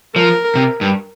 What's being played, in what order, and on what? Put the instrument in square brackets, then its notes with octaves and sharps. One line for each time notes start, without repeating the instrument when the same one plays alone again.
[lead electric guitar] F3 [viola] A#4
[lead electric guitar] C3
G2